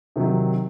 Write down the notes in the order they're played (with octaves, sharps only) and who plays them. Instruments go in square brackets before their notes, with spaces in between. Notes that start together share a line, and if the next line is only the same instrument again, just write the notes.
[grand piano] C3 D#3 F#3